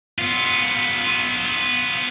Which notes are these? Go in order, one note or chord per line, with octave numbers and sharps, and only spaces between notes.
B3 F4